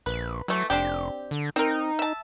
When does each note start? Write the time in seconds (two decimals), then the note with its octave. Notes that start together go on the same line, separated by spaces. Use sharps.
0.06 A#1 B4
0.48 E3 F#3 A3
0.70 F1 C4 D4 G4
1.31 D3
1.56 C4 D#4 A#4
1.99 E5 A5